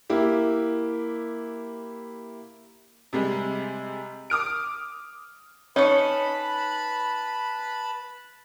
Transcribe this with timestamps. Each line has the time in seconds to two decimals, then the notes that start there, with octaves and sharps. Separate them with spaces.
0.10 A#3 E4 G4
3.13 C3 G3 G#3
4.30 D6 D#6 F6 D7
5.76 C#4 D#4 B4 C#5 A5 B5